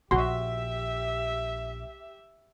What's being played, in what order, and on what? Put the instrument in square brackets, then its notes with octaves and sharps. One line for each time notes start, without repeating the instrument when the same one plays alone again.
[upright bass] A#1 [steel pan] F#4 C6 [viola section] G4 E5